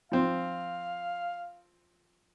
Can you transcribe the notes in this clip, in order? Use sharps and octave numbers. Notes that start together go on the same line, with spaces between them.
F3 C4 F5